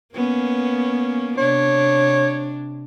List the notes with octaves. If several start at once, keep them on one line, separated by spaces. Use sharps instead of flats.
A#3 B3 C#4
C3 D4 C#5